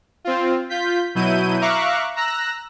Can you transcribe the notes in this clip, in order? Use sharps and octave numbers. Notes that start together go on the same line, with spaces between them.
C4 F4
F4 G6 B6
B2 F#3 E4 G6 D#7
E5 F5 A#5 C#6 D6 F#6
A#5 E6 F#6 A#6